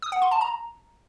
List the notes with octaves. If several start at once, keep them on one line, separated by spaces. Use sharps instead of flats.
D#6
F#5
C6
A5
A#5